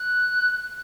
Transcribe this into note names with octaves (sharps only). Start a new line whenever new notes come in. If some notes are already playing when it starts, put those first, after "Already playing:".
Already playing: F#6